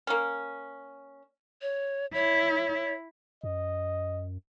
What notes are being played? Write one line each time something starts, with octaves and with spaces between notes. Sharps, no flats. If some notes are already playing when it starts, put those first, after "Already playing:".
A#3 C#4
C#5
E4 C#5
F#2 D#5